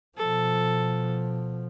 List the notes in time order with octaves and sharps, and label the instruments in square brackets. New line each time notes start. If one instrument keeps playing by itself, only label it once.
[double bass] B2 F3 [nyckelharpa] A4